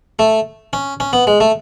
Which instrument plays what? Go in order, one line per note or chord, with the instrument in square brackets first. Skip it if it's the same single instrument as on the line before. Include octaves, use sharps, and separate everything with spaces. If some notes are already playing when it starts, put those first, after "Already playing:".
[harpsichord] A3
C#4
C#4
B3
G#3
A3